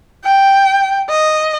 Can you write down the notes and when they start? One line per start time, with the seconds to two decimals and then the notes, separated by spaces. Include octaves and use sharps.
0.24 G5
1.09 D#5